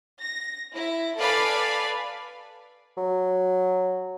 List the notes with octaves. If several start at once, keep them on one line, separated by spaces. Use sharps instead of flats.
A#6
E4
A4 B4 D5 F5 G#5 B5
F#3